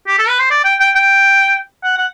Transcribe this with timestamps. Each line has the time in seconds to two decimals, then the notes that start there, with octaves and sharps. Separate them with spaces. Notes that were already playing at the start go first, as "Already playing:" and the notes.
0.07 G4
0.18 A4
0.29 B4
0.39 C5
0.51 D5
0.64 G5
0.80 G5
0.95 G5
1.84 F#5
1.98 F#5